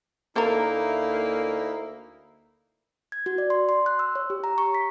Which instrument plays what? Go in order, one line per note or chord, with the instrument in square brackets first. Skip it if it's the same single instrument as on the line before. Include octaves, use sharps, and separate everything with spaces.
[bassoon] D2 [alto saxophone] A#3 [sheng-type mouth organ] D#4 E4 [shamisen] A4 A#4
[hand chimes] G#6
F#4
D5
C6
C6
F#6
E6
C#5
G4
A#5
C#6
B6